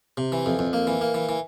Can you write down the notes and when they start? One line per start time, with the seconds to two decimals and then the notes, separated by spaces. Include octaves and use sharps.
0.17 C3
0.32 E3
0.46 F2
0.59 F2
0.73 A#3
0.87 E3
1.01 A#3
1.14 E3
1.29 E3